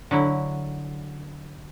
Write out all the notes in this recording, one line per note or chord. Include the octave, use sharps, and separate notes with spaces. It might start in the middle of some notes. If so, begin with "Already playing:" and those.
D3 F#3 E4